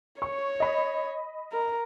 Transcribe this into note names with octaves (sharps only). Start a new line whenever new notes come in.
C#5 C#6
D#5 B5
A#4